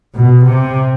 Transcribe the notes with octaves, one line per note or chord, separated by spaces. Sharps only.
B2
C3